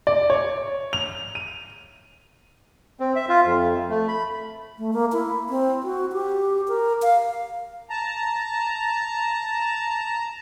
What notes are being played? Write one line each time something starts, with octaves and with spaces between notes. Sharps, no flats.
D5
C#5
F7
D#7
C4
E5
F4
F2
A3
B5
A3
A#3
E4
C4
F#4
G4
A#4
F5
A5 A#5